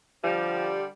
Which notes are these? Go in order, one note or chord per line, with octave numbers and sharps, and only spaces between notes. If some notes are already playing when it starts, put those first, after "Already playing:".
D3 F3 G3